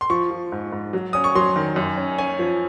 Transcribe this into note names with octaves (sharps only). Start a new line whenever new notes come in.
C6
F3 C#6
F3
G#2
G#2
F#3
C#4 D#6
C#6
F#3 C6
D#3
F#2
C#4
C#4 G#5
F3